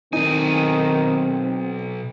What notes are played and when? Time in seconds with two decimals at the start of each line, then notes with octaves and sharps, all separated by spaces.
0.13 B1 D#3 C4 D#4 G#5